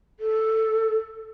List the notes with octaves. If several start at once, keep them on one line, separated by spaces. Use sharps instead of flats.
A4